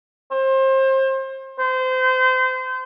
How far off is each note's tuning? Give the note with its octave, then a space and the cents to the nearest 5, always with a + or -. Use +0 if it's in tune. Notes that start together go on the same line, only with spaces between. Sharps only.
C5 +30
C5 -30